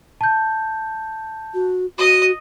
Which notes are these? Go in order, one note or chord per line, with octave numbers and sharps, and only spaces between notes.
A5 G6
F#4
F#4 D#5 D#6